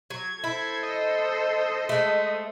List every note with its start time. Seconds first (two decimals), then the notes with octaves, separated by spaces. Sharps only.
0.10 F#3 G#6
0.44 E4 A4 C5
0.83 D#5
1.89 G#3 A3